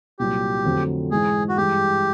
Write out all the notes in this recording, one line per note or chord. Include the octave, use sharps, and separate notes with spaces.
C2 A#2 F#3 G4
F2 D3 F#3 A3 C4
G#2 E3 G#3 G#4
F#4
G2 E3 G#3 G4